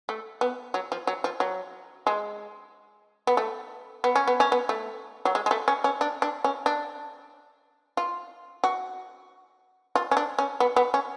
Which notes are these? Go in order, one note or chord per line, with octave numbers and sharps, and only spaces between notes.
A3
B3
F#3
F3
F#3
F3
F#3
G#3
B3
A3
B3
C#4
B3
C#4
B3
A3
F#3
G#3
G#3
A3
C#4
C#4
D4
D4
C#4
D4
F4
F#4
F4
C#4
D4
C#4
B3
B3
C#4